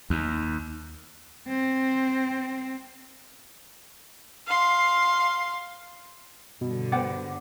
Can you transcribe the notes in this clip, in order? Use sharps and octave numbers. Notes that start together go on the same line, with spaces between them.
D#2
C4
F5 C6
G2 B2 D3
B3 B4 C5 F#5 D6